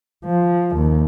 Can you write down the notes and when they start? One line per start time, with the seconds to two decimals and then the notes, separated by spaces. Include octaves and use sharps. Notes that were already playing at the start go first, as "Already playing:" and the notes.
0.24 F3
0.76 D#2